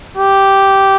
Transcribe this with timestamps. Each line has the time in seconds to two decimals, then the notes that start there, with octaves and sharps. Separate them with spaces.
0.17 G4